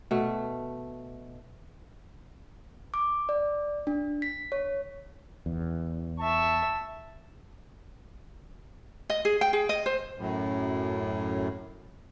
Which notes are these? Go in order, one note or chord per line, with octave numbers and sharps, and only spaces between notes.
B2 A3
D6
D5
D4
B6
C#5
E2
E5 A5 C#6
D#5
G#4
G5
G#4
D#5
C5
F#2 A2